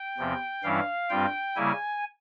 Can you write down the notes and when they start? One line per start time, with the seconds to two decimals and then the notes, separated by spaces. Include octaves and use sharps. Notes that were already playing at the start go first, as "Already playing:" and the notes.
Already playing: G5
0.17 E2 C3 F3 C4
0.64 G2 E3 G3 C#4 E4 F5
1.10 G2 G3 C4 F4 G5
1.56 C#3 G3 A#3 E4 G#5